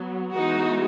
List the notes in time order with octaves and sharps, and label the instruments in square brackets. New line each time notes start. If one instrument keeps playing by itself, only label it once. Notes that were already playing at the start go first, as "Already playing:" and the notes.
Already playing: [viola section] F#3 B3
E3 G#3 B3 D#4 F#4